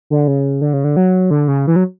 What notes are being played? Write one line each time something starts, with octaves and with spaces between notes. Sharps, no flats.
D3
C#3
D3
C#3
D3
F#3
D3
C#3
E3
F#3